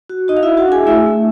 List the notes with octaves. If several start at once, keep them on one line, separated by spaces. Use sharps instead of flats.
F#4
D#4 F#4 D#5
F5
E4 F#4 E5
F#4 F#5
D4 G#4 G#5
A3 E4 E5
A3